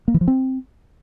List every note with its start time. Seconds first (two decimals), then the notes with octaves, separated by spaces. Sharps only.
0.08 A#3
0.14 E3
0.21 F3
0.28 C4